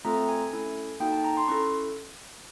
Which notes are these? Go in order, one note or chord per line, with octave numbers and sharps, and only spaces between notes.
A3 C4 F4 A4 A#5
G#5
A3 C#4 E4 A4
A#3 D#4 F#4 A4 G5
A5
A#5
C6
C#4 E4 A4 C#6